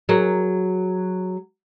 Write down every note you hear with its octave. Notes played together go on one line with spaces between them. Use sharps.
F#3 G#4 A#4